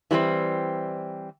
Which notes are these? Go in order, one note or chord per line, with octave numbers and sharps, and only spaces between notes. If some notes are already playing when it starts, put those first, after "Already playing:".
E3 G3 B3 C4